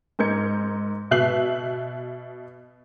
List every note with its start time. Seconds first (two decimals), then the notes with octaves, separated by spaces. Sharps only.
0.19 G#2 A#4 G6 G#6 C#7
1.11 B2 E5 F#6 C7 F#7